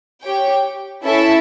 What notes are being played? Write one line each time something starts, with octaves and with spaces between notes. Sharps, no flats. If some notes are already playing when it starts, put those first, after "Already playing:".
G4 C#5 G5
C#4 E4 A4 E5 A5